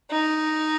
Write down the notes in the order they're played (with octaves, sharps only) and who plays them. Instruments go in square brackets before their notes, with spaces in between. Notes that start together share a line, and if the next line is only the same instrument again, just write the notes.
[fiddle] D#4